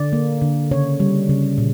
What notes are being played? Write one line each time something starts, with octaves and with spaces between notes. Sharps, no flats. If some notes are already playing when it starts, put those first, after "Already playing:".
Already playing: D3 D5
A#3
D3
C#3 C#5
G3
C#3
A#2